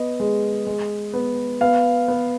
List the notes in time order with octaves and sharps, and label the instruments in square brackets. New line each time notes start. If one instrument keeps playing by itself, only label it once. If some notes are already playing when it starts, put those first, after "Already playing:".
Already playing: [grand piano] B3 D#5
G#3
G#3
B3
B3 F5
B3